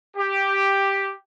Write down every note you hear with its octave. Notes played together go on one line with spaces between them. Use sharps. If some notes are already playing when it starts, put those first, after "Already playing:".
G4